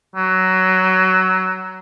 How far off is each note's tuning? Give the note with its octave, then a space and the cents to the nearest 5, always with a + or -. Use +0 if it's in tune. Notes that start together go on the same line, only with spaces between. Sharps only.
F#3 +15